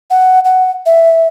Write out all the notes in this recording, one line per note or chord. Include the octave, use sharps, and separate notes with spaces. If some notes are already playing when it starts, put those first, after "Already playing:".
F#5
F#5
E5